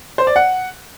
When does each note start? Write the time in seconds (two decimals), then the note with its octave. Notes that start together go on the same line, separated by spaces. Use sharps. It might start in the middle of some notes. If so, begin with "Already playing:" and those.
0.18 C5
0.27 D5
0.36 F#5